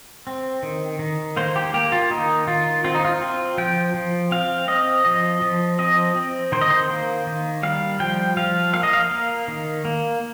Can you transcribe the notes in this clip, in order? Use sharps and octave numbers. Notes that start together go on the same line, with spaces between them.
C4
D#3
D#3
A#3 C5
G4
A#3 G4
F4
D#3 D#4
D#3 F4
C4 F4
D#4
F4
C4
F3 G5
F3
C4 F5
C4 D#5
F3 D#5
F3
C4 D#5
C4
D#3 C5
D#5
C5
A#3
D#3
G3 F5
F3 G5
F3 F5
A#3 F5
D#5
F5
A#3
D#3
A#3